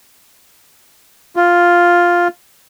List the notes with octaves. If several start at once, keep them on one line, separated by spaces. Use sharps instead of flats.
F4